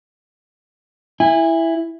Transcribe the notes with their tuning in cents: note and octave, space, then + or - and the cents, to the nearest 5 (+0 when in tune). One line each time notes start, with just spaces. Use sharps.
E4 +5 G#5 -30